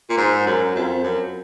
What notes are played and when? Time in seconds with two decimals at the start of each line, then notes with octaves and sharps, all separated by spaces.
0.09 A#2
0.17 G#2
0.46 F#2
0.75 F2
1.03 F#2